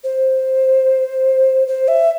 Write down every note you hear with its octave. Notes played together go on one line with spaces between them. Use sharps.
C5
C5
E5